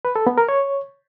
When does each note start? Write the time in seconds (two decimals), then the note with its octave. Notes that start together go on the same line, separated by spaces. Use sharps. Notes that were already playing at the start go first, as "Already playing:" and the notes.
0.05 B4
0.16 A4
0.27 B3
0.38 A#4
0.49 C#5